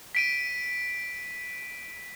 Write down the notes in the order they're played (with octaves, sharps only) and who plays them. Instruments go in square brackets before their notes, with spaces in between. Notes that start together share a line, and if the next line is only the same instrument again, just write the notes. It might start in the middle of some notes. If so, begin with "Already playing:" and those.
[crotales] B6 D7 D#7